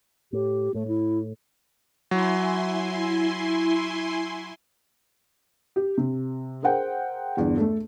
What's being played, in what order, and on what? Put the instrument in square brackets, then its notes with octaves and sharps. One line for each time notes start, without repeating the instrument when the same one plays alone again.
[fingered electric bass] A2 [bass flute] G4
[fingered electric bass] A2 [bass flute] A3
[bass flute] E4
[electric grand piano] F#3 [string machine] E4 G#5 C6
[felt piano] G4
C3
G#4 A#4 C5 F#5 G5
G1 E2 D3
A3 A4